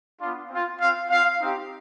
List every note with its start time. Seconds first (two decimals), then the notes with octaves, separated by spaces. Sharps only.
0.20 B3 D4 F4
0.50 C4 F4
0.79 C4 F4 F5
1.10 C4 F4 F5
1.41 C4 D#4 G4